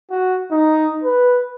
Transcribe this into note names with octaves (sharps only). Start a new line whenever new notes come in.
F#4
D#4
B4